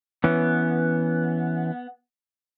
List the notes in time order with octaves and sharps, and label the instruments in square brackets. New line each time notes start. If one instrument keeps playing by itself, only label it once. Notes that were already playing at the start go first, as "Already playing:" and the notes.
[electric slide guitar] E3 C#4 [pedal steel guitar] B3